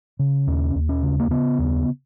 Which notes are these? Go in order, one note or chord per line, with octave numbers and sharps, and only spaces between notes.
C#3
D#2 C#4
D#2
C#4
C#3
A#3
C#3 B3
D#2